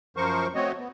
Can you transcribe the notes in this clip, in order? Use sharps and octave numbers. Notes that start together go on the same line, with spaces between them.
F#2 F3 A#4 C5 C#6
A3 C4 F#4 C#5 D#5
B3